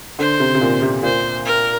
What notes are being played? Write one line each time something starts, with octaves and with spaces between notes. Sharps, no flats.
D3 C5
C3
C3
A#2
C3
A#2 C5
A#4